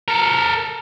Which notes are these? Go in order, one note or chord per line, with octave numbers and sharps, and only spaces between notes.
A4 A#4